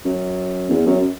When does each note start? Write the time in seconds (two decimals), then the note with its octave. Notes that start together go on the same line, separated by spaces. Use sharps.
0.05 F#2
0.70 E2
0.86 F#2